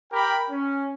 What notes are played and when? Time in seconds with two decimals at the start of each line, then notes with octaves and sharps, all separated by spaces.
0.12 G4 A#4 G5 B5
0.50 C#4